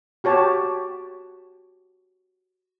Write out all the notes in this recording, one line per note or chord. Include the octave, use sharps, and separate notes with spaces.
F#4 G4 C#5 A5